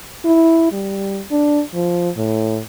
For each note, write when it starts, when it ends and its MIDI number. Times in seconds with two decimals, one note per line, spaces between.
0.25 0.68 64
0.72 1.22 55
1.31 1.62 62
1.74 2.10 53
2.17 2.61 45